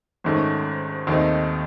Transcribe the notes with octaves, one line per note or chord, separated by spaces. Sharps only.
G#1 G#2 D#3 A3 C#4
D#2 D#3 A3 C4 D#4